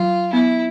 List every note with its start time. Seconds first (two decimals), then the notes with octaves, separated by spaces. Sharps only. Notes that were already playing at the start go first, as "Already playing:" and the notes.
Already playing: F#3 F4
0.33 B3 E4